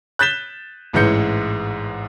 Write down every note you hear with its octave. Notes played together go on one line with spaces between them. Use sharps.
F#6 G6 A6 B6 E7 G7
A1 G#2 E3 G#3 G6 C#7